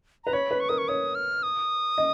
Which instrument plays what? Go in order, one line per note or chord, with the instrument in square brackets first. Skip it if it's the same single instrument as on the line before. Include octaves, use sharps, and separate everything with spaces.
[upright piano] B4 [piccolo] A#5
[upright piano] C#5 [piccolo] B5
[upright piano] B4
[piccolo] C#6
[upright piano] A#4 [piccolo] D#6
[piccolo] C#6
[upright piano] C#5 [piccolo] D#6
[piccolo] F6
D#6
[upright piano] D#5